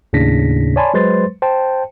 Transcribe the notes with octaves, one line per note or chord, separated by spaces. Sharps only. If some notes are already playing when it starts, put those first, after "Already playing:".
D#2 A2 C#3 D4 A#6 B6
C#5 D5 G#5 A5 B5 C6
F#3 G#3 B4 C5 C6 A6
C5 G5 A5